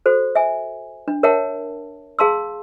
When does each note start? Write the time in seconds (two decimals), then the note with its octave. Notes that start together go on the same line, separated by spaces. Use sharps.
0.06 F#4 A4 C5
0.35 E5 G#5
1.08 D4
1.23 A#4 C#5 E5 F#5 G5 A5
2.19 G#4 F5 A5 C6 E6